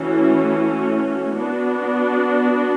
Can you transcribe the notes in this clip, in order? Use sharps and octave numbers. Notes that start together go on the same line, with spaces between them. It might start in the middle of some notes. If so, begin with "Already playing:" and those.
Already playing: E3 A3 C#4 F#4
B3 D4 F#4